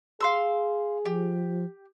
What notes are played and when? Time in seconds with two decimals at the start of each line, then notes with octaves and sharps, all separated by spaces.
0.20 G#4 F5 C6 E6
1.05 F3 G4